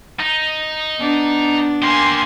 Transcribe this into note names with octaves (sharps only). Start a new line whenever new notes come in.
D#4
B3 D4
A#3 G4 G#5 C6